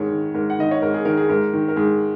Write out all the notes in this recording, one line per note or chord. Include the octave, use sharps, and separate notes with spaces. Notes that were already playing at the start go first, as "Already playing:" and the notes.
Already playing: G#2 D#3 G#4 A#4 C#5
D#3
G#2 A#4
F#5
D#3 D#5
C#5
G#2 A#4
G#4
D#3 A#4
G#4
G#2 A#4
D#3
A#4
G#2 G#4